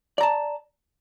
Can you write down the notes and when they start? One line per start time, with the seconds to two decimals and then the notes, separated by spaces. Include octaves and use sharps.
0.18 D5
0.21 A#5
0.23 A5